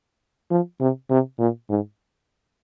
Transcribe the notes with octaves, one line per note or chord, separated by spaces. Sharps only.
F3
C3
C3
A#2
G#2